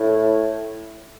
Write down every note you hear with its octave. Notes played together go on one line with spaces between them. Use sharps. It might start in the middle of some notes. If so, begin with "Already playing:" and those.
Already playing: A2